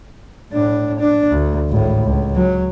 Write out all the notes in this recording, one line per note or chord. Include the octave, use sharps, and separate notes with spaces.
A2 D4
D4
D2
G#1 A2
C#2
F#3